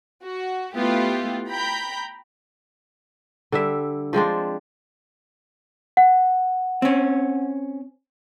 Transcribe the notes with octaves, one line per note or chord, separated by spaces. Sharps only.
F#4
A3 B3 E4 F4 G4
G5 A#5 B5 G6 B6
D3 G3 E5
F3 G#3 C4 D4
F#5
C4 C#4